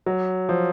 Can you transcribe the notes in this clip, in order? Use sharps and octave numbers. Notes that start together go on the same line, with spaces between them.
F#3
F3